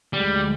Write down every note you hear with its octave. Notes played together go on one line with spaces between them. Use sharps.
D2 D3 G3 G#3